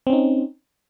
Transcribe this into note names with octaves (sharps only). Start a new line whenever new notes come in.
C4 C#4 D#4